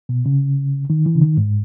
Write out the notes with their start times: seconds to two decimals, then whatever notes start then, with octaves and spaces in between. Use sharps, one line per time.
0.09 B2
0.26 C#3
0.90 D#3
1.06 E3
1.15 C#3
1.21 D#3
1.37 G#2